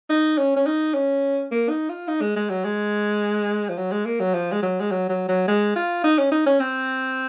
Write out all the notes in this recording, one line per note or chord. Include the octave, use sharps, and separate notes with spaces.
D#4
C#4
C#4
D#4
C#4
A#3
D#4
F4
D#4
G#3
G#3
F#3
G#3
F3
F#3
G#3
A#3
F#3
F3
G#3
F#3
G#3
F#3
F#3
F#3
G#3
F4
D#4
C#4
D#4
C#4
C4